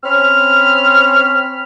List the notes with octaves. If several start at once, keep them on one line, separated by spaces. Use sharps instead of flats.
C4 C#4 B5 F6